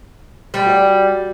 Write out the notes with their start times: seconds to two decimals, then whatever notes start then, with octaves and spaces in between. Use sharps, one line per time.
0.54 G3
0.66 F#4 D5